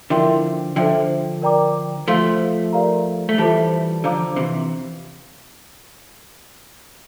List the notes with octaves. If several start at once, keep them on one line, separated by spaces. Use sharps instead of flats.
D3 F3 E4 A#4 E5 G5 C6
D3 F3 A4 C5 E5 G5
A#4 D5 G5 A#5 D6
F3 A3 F4 C5 F5 C6
G4 A#4 D5 F5 A#5
A3
E3 G3 F4 A4 C5 E5 A5
D3 F3 C5 F5 A#5 D6
C3 E3